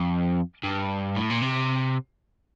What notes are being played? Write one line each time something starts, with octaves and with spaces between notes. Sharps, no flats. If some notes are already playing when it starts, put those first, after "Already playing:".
Already playing: F2
G2
A2
A#2
C3